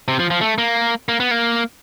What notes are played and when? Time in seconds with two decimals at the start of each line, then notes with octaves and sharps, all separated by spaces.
0.08 C3
0.19 F3
0.30 F3
0.41 A3
0.58 A#3
1.09 A#3
1.20 B3
1.31 A#3